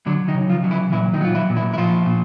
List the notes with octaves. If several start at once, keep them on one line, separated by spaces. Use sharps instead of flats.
D3 F#3 D4
D#3 D#4
C#3
F3 F4
F#3
E3 E4
A#2 E3 E4
D#3 D#4
F#3 F4
E3 E4
A#2
E3 E4
E4
A#2 F3 F4
A#2